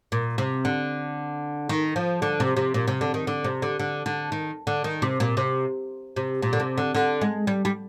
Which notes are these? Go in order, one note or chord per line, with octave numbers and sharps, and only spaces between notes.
A#2
C3
D3
D#3
F3
D3
C3
C3
A#2
C3
D3
D#3
D3
C3
D3
D3
D3
D#3
D3
D#3
C3
A#2
C3
C3
A#2
D3
C3
D3
D3
G#3
G3
G3